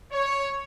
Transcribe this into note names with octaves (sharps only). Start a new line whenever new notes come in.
C#5